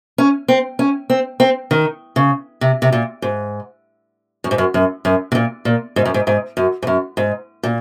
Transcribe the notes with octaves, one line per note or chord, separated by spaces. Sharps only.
C#4
C4
C#4
C4
C4
D#3
C#3
C3
C3
A#2
G#2
F#2
G#2
F#2
F#2
F#2
C3
A#2
A#2
G#2
F#2
G#2
G#2
F#2
G#2
F#2
G#2
A#2